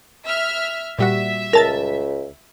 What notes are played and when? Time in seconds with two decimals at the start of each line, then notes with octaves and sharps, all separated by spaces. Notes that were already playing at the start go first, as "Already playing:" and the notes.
0.24 E5 F6
0.98 A#2 G3 F#4 E5
1.53 C#2 A#4 A5 A6